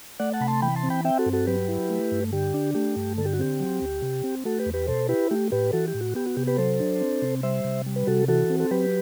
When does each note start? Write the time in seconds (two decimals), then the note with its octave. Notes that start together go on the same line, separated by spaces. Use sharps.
0.20 A3 D5 F#5
0.33 F#5 A5
0.40 C3 B5
0.48 A5 C6
0.62 E3 G5 B5
0.76 A5 C6
0.83 C4
0.90 G5 B5
1.05 C4 E5 G5
1.19 F#4 A4
1.26 G2
1.33 F#4 A4
1.47 F#3 G4 B4
1.68 E4
1.90 A3
2.11 G2
2.33 D3 G4
2.54 D4
2.75 A3 G4
2.96 G2
3.18 D3 A4
3.25 G4
3.33 F#4
3.39 C4 G4
3.60 F#3
3.82 D2
4.02 C3
4.24 C4
4.45 A3 F#4 A4
4.59 G4 B4
4.66 E2
4.74 G4 B4
4.87 B2 A4 C5
5.09 E4 G4 B4
5.31 A3 G4
5.52 A2 G4 B4
5.73 E3 F#4 A4
5.88 G4
5.94 A2
6.01 F#4
6.15 B3 G4
6.26 F#4
6.37 C3 G4
6.47 G4 B4
6.58 F#3 A4 C5
6.80 D4
7.01 C4
7.22 C3
7.43 G3 C5 E5
7.64 C3
7.86 G3
7.96 B4
8.07 C3 F#4 A4
8.28 E3 F#4 A4
8.50 C4
8.60 A4
8.71 F#3 G4 B4